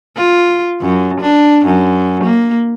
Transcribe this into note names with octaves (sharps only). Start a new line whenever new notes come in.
F4
F#2
D4
F#2
A#3